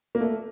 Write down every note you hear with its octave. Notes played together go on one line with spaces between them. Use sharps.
A#3
A3